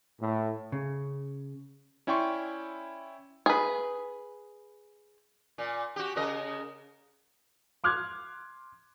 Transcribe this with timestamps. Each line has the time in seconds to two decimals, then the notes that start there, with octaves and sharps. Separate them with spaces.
0.20 A2
0.72 C#3
2.07 C#4 E4 D5 G5 C6 C#6
3.46 G#4 B4
5.58 A#2
5.96 F#4 G4
6.16 C#3 A#4 D#5
7.84 C6 D6 F6 F#6 G#6